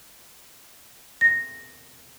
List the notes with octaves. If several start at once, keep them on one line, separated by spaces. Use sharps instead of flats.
A#6